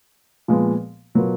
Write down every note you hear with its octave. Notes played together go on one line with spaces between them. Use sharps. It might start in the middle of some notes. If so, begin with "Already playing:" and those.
A#2 F3 G#3 B3
B2 F#3 B3 F4 A#4